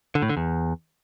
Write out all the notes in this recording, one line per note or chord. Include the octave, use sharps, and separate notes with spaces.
D3
A2
D3
E2